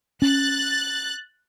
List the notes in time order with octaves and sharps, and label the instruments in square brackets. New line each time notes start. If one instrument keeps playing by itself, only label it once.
[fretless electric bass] C#4 [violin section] F#6 A6